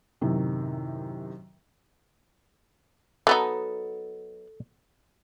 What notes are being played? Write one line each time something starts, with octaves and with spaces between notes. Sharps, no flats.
F#2 A2 C3 D#3
F#3 B3 D#4 A4